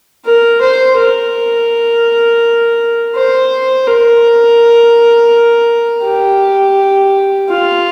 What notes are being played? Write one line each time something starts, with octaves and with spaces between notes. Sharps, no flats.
A#4
C5
A#4
C5
A#4
G4
F4